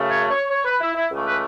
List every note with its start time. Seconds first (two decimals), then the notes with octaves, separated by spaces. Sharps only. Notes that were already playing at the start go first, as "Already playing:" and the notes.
Already playing: F#2 C#3 A3
0.09 C#5
0.30 C#5
0.50 C#5
0.65 B4
0.81 E4
0.95 E4
1.11 C#2 C#3 E3 A3
1.27 B4